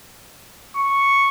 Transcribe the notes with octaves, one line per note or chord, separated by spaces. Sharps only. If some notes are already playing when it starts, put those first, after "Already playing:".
C#6